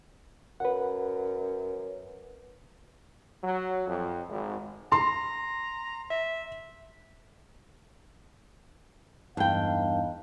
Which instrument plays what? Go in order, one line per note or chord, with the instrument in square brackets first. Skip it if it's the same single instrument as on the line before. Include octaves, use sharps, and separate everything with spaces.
[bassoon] F#2 [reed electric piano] B4 F#5
[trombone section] F#3
F2
G#1
[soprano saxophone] A#5 [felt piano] C6
[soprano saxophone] E5
[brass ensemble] E2 D#4 F5 [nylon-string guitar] G2 G5